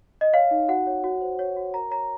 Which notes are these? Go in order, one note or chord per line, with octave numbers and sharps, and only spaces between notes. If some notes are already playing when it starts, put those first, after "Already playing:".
D#5
C#5 F5
D#4
F#4 F#5
C#5
F#4
C5
C#5
F#4
A#4 A#5
C#5 A#5